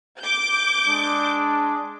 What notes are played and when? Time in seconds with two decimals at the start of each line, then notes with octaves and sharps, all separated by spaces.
0.21 D6 G6
0.88 G#3 D4